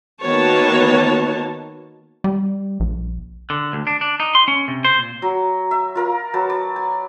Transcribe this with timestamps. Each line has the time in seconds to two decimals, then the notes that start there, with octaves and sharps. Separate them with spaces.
0.22 D#3 A#3 B3 F#4 C#5 A5
2.24 G3
2.80 A#1
3.50 D3
3.73 D2
3.87 D4
4.01 D4
4.20 D#4
4.35 C6
4.48 C#4
4.68 C3
4.84 C5
4.98 A#2
5.22 F#3
5.71 E5
5.95 F4 A#4 F5
6.34 F#3 B4 A5
6.50 D5
6.76 G#5